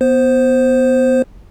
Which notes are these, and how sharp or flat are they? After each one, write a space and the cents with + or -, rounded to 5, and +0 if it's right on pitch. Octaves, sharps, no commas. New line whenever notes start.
B3 +0 C5 +0